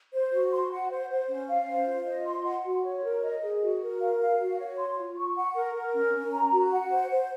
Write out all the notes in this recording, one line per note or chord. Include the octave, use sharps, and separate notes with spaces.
C5
F#4
C6
F#5
C5
C5
C#4
F5
C5
F4
D#5
C6
F#5
F#4
C#5
A#4
D#5
G#4
F#4
A#4
F5
F5
F#4
C#5
C6
F4
C#6
F#5
A#4
A#4
C#4
C#4
A#5
F#4
F#5
C5
C5